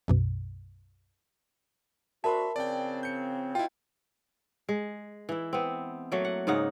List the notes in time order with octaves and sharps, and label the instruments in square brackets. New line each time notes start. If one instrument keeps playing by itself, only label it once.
[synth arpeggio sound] B1 F#2 B2
[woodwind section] C4 D4 F#4 [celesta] A#4 A5 [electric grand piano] E5 B5 C6
[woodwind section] C#3 F3 C4 [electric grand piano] D5 G5
[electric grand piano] G6 C#7
[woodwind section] B2 [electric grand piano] E4 F4 [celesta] G5
[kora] G#3
E3 E4
B3 C4
F#3 A3 A#3
F#5
G#2 C#3 D#4 F#5